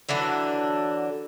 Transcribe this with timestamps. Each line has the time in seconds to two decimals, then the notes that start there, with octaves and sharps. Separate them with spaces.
0.09 D3 E3 F#3 D4